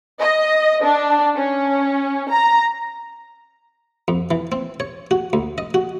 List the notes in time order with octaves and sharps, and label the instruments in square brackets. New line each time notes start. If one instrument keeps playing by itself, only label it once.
[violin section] D#5
D4
C#4
A#5
[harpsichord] F2
E3
C4
C#5
F#4
D2
D#5
F#4